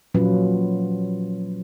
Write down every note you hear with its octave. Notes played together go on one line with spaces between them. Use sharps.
A#2 F3 F#3 C#4 F4 B4